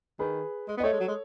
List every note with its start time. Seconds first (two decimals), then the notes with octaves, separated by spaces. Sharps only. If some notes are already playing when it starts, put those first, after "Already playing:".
0.19 D#3 G#4 B4
0.68 G#3
0.77 B3
0.80 D#5
0.83 A3 A4 C#5
0.93 G#3
1.00 F#3
1.08 G#3